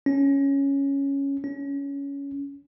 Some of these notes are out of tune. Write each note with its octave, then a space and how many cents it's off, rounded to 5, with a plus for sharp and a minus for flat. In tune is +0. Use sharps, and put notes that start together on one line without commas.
C#4 +0
C#4 +15